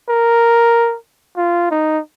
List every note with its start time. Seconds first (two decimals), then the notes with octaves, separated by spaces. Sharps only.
0.09 A#4
1.37 F4
1.70 D#4